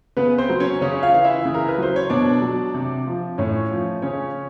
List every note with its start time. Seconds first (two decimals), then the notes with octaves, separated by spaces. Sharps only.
0.17 C#3 B3 B4
0.38 C4 C5
0.49 F#3
0.60 C#4 C#5
0.81 C#3 C#4 C#5
1.03 F4 F5
1.14 E3 F5
1.24 E4 E5
1.45 C#3
1.54 A#4
1.68 B4
1.78 F#3 C5
1.96 C#5
2.10 B2 D4 D5
2.42 F#3
2.74 C3
3.07 F3
3.38 A2 C#4 C#5
3.71 F3
4.02 C#3 C#4 C#5